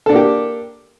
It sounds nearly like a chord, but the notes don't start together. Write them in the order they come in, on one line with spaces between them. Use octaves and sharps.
A4 D4 A#3 G4